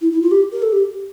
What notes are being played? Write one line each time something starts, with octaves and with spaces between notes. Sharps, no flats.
E4
E4
F4
G4
A#4
A4
G4